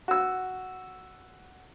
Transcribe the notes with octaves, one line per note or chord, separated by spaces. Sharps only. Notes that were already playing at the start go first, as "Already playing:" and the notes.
F#4 E6